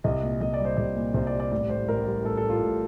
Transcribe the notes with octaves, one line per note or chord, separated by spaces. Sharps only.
C2 D#5
A#2
C2 D#5
D5
G3 C5
C2 D5
A#2
C2 C5
D5
G3
D5
A1 D5
A2 C5
A1 A#4
G3
A1 A4
A4
A2
F4
A1